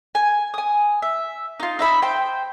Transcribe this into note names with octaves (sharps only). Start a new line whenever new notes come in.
G#5
G#5 D#6
E5
D#4 F4
D#4 E5 B5
C5 G5